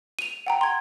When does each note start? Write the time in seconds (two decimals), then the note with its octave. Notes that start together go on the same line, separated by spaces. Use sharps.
0.19 D#7 F7
0.46 F#5 G5 A#5
0.61 C6 G#6